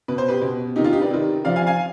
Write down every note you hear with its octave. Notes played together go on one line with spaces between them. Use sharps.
B2 B4
C5
G4 B4
B2
C3 D#3 D#4 G4
D4 F4
D#4 G4
B4 D5
C3 D#3
C3 F3 D5 F5
F5 G#5
F5 G#5